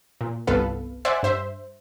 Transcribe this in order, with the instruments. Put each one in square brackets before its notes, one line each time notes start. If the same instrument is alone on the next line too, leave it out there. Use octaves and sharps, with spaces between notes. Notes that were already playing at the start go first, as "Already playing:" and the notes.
[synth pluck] A#2
G1 C2 B3 A4 B4 F5
C5 D5 E5 F#5 G#5
G2 C5 E5